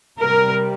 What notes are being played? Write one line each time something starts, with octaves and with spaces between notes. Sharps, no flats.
C3 G3 A#4